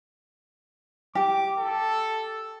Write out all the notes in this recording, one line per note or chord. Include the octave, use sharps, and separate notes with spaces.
G4 D6
A4